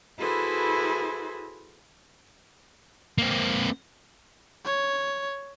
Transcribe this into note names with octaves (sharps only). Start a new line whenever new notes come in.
E4 F#4 G#4 A4 B4 C5
A#3 C4
C#5